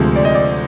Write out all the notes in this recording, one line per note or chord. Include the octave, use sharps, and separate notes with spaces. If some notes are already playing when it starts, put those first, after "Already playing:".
Already playing: D2 C3 F3 G#3
D5
D#5
D5